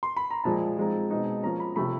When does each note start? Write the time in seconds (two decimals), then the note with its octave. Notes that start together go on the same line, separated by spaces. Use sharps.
0.03 C6
0.17 B5
0.31 A#5
0.44 A#2 F3 G#3 A5
0.78 F3 G#3 C4 D#4
1.10 B2 G#3 C4 D#4
1.43 F3 A#3 C#4 A#5
1.60 B5
1.76 C3 F3 A3 B5